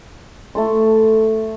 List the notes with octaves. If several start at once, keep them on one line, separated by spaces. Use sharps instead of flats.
A3 A4 C6